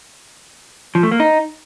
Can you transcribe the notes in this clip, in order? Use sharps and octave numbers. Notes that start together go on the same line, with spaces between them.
F3
A3
A#3
D#4